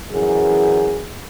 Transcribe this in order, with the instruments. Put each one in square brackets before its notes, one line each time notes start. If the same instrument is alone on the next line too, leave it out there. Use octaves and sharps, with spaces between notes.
[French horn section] F#2 E3 G#4